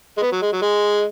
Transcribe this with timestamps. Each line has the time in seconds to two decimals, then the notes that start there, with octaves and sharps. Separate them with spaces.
0.18 G#3
0.22 B3
0.32 F#3
0.42 G#3
0.52 F#3
0.62 G#3